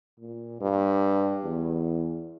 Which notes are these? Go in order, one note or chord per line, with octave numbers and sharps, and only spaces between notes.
A#2
G2
E2